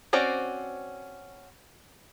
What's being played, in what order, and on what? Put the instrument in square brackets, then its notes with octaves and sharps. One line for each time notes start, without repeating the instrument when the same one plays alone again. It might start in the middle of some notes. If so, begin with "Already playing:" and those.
[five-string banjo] C4 C#4 F#4 C5 D5